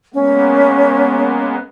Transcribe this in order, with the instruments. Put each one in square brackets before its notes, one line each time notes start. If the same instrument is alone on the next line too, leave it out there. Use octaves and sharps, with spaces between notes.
[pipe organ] G#3 A#3 B3 [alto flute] C#4